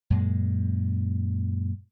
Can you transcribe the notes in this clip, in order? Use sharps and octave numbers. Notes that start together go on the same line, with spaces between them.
F#2 A#2 G#3